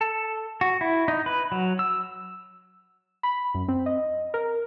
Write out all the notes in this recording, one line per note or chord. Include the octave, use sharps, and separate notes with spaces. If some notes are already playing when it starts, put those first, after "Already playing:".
A4
F#4
E4
D#4
B4
F#3
E6
B5
F#2
C4
D#5
A#4